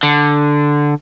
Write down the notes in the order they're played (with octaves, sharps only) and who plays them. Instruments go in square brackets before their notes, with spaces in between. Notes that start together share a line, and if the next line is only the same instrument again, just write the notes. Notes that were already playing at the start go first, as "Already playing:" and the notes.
[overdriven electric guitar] D3